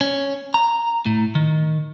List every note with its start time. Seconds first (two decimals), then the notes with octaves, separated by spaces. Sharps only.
0.01 C#4
0.54 A#5
1.06 A2
1.35 D#3